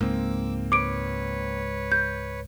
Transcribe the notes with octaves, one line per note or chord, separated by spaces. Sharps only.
C#2 G#2 A#3 C4 D6 E6
B4 C#5 D6 D7
G6